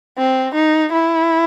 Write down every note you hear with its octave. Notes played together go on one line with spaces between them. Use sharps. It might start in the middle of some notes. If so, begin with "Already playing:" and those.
C4
D#4
E4